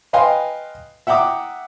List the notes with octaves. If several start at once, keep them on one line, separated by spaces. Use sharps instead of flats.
B4 D#5 F5 G5 G#5 C6
E5 F#5 G5 A#5 D6 D#6